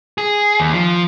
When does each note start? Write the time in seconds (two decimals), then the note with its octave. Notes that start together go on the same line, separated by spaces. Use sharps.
0.18 G#4
0.60 D#2
0.74 F3